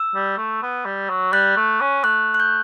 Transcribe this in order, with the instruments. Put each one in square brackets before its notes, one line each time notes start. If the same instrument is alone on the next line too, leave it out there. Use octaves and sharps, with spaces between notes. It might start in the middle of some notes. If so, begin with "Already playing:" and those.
Already playing: [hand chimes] E6
[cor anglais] G3
A3
B3
G3
F#3
[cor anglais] G3 [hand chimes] F#6
[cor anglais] A3
C#4
[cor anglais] A3 [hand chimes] F#6
[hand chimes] F#6
G6